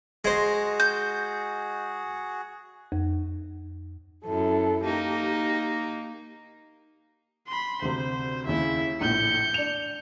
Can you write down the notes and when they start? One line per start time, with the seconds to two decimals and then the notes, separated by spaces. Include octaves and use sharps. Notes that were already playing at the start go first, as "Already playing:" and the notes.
0.25 G#3 F#4 G#4 C5 D#5 G#6 A#6
0.80 G6
2.92 F2
4.25 F#2 E4 A4
4.85 A#3 D#4 G4
7.47 B5 C6
7.82 D2 C3 C5
8.46 D#2 C#3 E4 E5
9.01 A#1 A2 G6 C#7
9.54 D4 F7